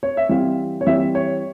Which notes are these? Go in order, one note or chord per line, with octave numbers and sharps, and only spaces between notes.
C#5
E5
E3 G3 C4 F5
C#5
E3 G3 C4 E5
C#5